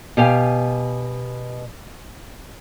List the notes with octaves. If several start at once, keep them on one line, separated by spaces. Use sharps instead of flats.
B2 G4 F5 G5 G#5